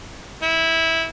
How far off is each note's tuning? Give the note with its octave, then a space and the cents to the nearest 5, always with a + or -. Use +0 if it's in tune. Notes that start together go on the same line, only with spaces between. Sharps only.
E4 -15